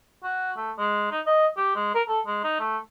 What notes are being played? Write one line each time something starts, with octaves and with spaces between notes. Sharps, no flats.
F#4
A3
G#3
D#4
D#5
G4
G#3
A#4
A4
G#3
D#4
A3